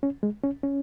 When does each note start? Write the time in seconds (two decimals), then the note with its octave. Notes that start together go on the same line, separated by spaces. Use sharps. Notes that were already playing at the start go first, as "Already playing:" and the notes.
0.03 C#4
0.23 G#3
0.44 C#4
0.63 C#4